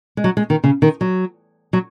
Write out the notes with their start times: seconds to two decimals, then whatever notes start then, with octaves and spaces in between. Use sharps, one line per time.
0.17 G#3
0.24 F#3
0.37 G#3
0.50 D#3
0.64 C#3
0.82 D#3
1.01 F#3
1.73 F#3